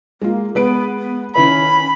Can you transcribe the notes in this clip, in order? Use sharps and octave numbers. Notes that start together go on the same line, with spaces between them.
G#3 A#3 F4
G#3 B3 B4 D7
B3
D#3 C#4 E4 B4 B5